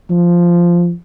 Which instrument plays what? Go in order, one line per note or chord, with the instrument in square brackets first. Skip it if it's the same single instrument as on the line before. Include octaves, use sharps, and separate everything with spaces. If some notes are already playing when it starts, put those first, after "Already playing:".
[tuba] F3